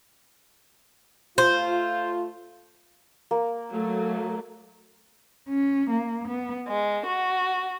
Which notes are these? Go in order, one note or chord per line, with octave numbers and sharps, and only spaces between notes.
A3 F4 C5
A#3
F#3 A3
C#4
A#3
B3
G#3
F#4